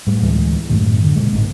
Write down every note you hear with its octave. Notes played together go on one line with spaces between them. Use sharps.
A2 G3
D2 E3 G#3
F#2 A2 D#3
D3
A#2 G#3
G#1 G#2